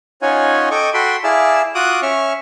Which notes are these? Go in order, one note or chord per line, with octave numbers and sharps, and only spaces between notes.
C#4 D#4 F4 C#5 F#5 G#5
A4 D#5 G5 C#6 D6
F#4 A4 G5 B5 C6
E4 G#4 D5 F5 A5 E6
F4 F#4 D6 D#6 F#6
C#4 E5 C#6 F6